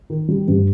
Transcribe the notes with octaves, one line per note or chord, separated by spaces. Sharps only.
D#3
G3
G2